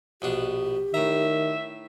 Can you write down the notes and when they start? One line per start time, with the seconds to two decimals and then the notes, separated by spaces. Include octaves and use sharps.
0.22 A#1 B2 D4 G4
0.94 A2 D#3 E5 A#5